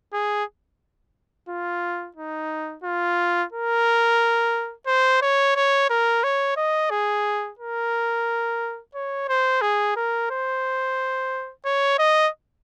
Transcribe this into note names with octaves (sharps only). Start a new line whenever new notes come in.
G#4
F4
D#4
F4
A#4
C5
C#5
C#5
A#4
C#5
D#5
G#4
A#4
C#5
C5
G#4
A#4
C5
C#5
D#5